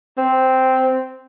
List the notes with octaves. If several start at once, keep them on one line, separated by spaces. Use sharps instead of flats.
C4